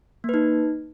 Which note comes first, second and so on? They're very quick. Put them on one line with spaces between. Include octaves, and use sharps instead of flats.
A#3 B4 D#4